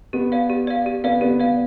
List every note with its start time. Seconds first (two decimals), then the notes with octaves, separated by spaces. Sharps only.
0.13 B3 G4
0.32 D5 F5
0.50 G4
0.67 D5 F5
0.86 G4
1.04 B3 D5 F5
1.21 B3 G4
1.40 D5 F5